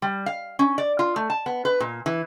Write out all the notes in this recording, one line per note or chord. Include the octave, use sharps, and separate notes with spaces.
G3
F5
C#4
D5
F4
A3
A5
B3
B4
A#2
E3